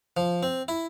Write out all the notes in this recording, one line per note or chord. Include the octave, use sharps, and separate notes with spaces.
F3
C4
E4